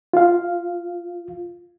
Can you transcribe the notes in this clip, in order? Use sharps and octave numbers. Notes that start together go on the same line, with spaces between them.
F4 F5